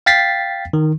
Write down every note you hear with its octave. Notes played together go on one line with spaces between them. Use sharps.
F5 G5 A6 B6 C7
D#3